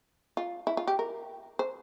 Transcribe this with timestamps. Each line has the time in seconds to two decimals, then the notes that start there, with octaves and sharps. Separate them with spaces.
0.37 F4
0.67 E4
0.77 F4
0.88 G4
0.99 A#4
1.59 C5